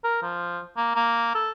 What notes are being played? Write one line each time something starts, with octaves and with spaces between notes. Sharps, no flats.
A#4
F3
A#3
A#3
A4